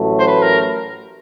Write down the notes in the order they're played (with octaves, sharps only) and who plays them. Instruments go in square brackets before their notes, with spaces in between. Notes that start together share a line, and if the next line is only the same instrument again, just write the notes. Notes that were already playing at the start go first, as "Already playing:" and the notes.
Already playing: [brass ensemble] A1 A2 F#3 A3
[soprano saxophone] C5
B4
A#4